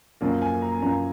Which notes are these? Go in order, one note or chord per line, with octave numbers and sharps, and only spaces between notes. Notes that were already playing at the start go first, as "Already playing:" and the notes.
F#2 F3 A#3
G#5
A#5
F#2 F3 A#3 A#5